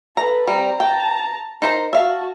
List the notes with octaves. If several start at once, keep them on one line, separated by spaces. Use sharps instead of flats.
A4 B4 A#5
G3 C4 A#5
G5 A5 A#5
D#4 A#4 C5 A#5
F#4 E5 F5 A5